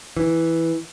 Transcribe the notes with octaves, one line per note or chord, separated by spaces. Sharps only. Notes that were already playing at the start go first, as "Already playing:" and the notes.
E3